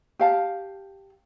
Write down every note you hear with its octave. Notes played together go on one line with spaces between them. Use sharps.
G4 F5 A5